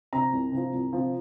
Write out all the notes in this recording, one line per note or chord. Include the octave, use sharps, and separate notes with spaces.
C3 F3 A#5
C2
C3 F3
C2
C3 F3